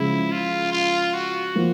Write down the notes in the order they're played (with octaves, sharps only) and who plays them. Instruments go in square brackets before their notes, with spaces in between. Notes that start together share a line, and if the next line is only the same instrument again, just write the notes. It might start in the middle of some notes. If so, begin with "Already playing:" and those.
Already playing: [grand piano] C#3 F3 G#3 [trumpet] E4
[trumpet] F4
F4
F#4
[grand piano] F3 A#3